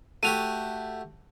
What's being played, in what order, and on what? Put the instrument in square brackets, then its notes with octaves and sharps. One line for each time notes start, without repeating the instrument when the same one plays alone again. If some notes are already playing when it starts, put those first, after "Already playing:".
[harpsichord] A3 F#4 G4 [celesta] D#7 F7